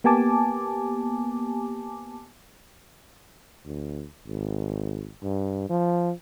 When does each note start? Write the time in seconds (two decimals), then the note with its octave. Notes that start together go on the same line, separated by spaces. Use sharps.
0.04 A#3 B3 G4 G#5 A5 D6
3.66 D2
4.27 G#1
5.23 G2
5.70 F3